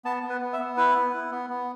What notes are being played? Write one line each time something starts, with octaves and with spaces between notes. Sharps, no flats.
B3 A5
B3
B4
B3
E5
B3
E4 B4
B3
E4
B3
B3